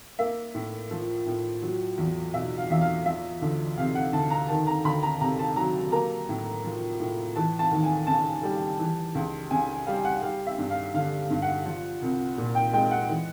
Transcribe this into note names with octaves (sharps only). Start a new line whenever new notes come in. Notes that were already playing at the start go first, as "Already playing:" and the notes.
A#3 E5
A2
F3
A2
F#3
E2
B2 E5
F5
E2 E5
F5
F3 E5
D2
C3 F5
F#5
D2 A5
A#5
D#3 A5
A#5
D2 B5
A#5
C3 A#5
A5
F#3 A#5
A#3 A#5
A2
F3
A2
E3 A5
A5
D#2
G#5
C#3 A5
G3
E3
C#2
C#3 G#5
G3 F5
F#5
G3 F5
E5
G2
F5
D3 F5
G2
F#5
F3
C2
A#2
G5
G#3 G5
F#5
E3